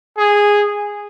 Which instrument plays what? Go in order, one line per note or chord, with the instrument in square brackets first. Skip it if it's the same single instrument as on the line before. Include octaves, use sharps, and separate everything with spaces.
[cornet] G#4